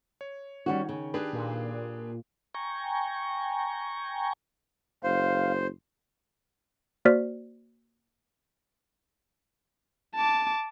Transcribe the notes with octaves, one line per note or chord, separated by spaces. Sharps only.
C#5
D#3 G3 C#4 F#4
C#3
D4 G4 G#4 B4
A#2
G5 G#5 A#5 C#6
F#1 C5 F5
A#3 F#4 C5 D5 F6 B6
A5 D6